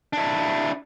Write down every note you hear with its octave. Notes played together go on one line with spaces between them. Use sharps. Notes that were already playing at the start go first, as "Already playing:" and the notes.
D4 E4